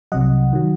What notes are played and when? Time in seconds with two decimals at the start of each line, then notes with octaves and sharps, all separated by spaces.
0.12 C2 C3 F#3 D#5 F#5
0.53 D#3 F#3